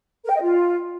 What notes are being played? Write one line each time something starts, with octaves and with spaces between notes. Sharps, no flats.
A#4
G5
D#5
F4